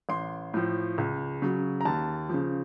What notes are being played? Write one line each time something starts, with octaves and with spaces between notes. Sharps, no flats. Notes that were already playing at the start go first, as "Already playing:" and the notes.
A1 C6
A2 F3
C#2
C#3 F#3
A#5
D#2 A5
C#3 F3